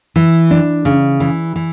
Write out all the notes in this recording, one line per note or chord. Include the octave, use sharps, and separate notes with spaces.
E3
D4
C#3
E3
E3